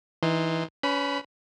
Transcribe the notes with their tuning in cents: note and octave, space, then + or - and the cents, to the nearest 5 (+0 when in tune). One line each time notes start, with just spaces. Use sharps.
E3 -15 D#4 +0 C6 +0
C#4 +30 B4 +35 B5 -10